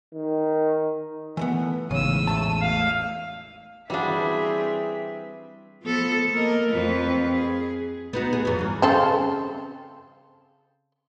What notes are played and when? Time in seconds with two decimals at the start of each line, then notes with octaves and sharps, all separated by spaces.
0.13 D#3
1.37 E3 A3 B3
1.91 A1 E2 G#2 C#3 E6 D#7
2.27 A3 A5
2.62 F5
3.90 E3 G3 C4 D4 F#4 G#4 E5 F5
5.83 F3 B3 A4
6.32 A#3 A#4 D#5
6.70 F2 F3 B4
7.33 G#4
8.13 B3 D#4 F#4
8.33 G#4
8.45 F2 F#3
8.59 G2 E3
8.82 C#3 C4 A4